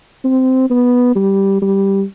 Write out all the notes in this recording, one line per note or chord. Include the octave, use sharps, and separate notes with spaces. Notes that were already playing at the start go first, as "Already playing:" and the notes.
C4
B3
G3
G3